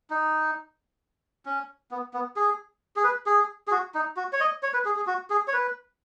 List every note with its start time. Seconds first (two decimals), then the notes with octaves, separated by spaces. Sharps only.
0.10 D#4
1.46 C#4
1.91 B3
2.14 B3
2.36 G#4
2.96 G#4
3.04 B4
3.26 G#4
3.68 G#4
3.71 F#4
3.94 D#4
4.17 F#4
4.33 C#5
4.40 D#5
4.63 C#5
4.74 B4
4.85 G#4
4.96 G#4
5.07 F#4
5.30 G#4
5.48 C#5
5.53 B4